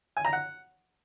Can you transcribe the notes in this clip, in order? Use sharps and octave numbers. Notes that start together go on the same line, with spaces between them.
G#5
A#5
F#5